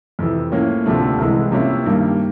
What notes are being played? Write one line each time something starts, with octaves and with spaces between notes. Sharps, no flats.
F2 C3 E3
A2 F3 A#3 C#4
D2 C3 F3 A3 D4
C2 C3 E3 G#3
C3 F3 A#3 C#4 E4
G2 D#3 G3 A#3